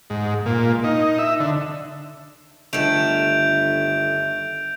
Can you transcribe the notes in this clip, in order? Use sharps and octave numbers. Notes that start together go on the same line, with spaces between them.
G#2
A#2
D#4
E5
D3
G1 D#3 A3 G6 D7 F7